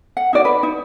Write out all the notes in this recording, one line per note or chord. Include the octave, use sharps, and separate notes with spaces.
F#5
D#4 F#4 D5
B4
D#4